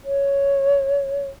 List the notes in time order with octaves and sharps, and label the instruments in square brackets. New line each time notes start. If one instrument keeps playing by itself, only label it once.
[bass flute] C#5